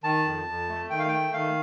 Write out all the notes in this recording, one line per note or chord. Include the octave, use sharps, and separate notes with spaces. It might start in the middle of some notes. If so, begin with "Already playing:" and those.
D#3 A5
F2
F2
A3
D#3 G5
F5
A3 G5
D#3 F5